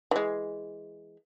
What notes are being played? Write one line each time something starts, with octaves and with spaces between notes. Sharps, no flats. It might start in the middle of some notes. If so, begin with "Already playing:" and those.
E3 G#3